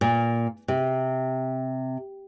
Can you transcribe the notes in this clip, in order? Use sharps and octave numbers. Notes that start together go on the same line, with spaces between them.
A#2
C3